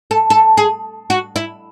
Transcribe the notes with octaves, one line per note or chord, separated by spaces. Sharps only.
A4
A4
G#4
F#4
E4